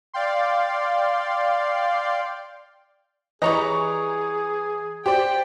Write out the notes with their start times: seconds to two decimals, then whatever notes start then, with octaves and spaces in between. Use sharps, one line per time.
0.14 D5 F5 G5 C6
3.42 E3 G3 G#4 C#5 D#5 A#5 C#6
5.06 G4 C5 D5 G5